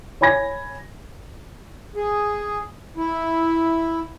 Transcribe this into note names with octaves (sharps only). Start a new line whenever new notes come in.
C#5 G#5 B5 G#6 A#6
G#4
E4